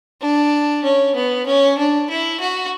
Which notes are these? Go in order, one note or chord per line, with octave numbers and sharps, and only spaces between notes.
D4
C#4
B3
C#4
D4
E4
F#4